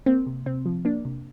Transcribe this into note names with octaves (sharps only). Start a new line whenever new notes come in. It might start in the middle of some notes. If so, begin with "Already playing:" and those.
A#3 C4
C3
C3 C4
F3
A#3 D4
C3